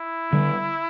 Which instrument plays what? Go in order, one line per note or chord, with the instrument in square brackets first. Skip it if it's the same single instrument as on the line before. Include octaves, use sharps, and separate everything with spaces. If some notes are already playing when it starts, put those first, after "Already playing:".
Already playing: [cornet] E4
[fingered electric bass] D3 G3